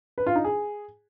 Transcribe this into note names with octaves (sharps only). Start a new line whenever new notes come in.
B4
F4
D#4
G#4